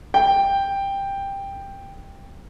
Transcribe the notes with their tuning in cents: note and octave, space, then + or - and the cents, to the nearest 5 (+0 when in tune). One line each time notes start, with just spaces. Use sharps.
G5 +10